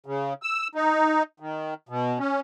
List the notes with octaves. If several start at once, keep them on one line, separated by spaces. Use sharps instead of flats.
C#3
E6
D#4
D#3
B2
C#4